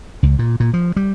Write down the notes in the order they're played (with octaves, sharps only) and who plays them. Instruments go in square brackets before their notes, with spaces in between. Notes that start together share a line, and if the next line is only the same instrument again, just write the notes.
[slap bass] C#2
A#2
A#2
F3
G3